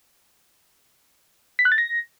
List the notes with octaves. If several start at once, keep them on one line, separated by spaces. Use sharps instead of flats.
B6
F#6
A6
A#6